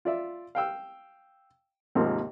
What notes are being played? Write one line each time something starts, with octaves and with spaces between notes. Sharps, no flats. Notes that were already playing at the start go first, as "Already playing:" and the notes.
F4 D5 E5
F5 G5 E6
D#2 G#2 C3 F3 A#3